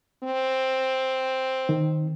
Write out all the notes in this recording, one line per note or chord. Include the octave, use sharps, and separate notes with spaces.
C4
D#3